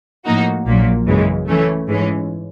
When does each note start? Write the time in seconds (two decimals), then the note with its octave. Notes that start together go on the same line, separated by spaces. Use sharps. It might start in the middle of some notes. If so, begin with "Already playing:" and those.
0.25 A2 F3 A#3 D#4 F#4
0.67 A#1 A#2 F#3 A#3
1.06 F#2 C#3 E3 G#3
1.47 E3 A3 C#4
1.88 G#2 E3 G#3 C#4